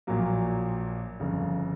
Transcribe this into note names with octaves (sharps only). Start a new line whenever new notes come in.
A#1 A#2 F#3 A#3
G1 F2 C#3